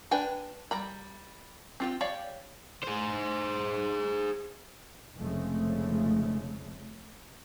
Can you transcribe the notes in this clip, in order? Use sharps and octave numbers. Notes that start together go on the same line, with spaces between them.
D4 B4 G5 G#5
G3 A#5 B5
C4 F4 G4
G4 C#5 D5 F5
G#4 C5
F1 C#3 F3 G#3 A3